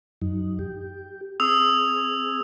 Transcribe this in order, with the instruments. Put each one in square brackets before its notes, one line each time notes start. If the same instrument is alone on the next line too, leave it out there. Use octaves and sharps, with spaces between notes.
[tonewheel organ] F#2 F#3 D#4
G4
[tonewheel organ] C4 G#4 [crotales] D#6 E6 F7